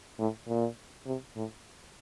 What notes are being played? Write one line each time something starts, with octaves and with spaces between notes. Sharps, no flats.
A2
A#2
C3
A2